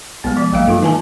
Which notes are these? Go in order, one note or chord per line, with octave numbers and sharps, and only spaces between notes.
C2 G#3 B3
F3 D5
A#1 F#3 A#3 F5
G2 D#4 F4 A4
E3 E4 G#5 A5